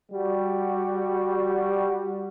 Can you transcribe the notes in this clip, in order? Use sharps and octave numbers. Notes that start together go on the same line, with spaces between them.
G3 F#4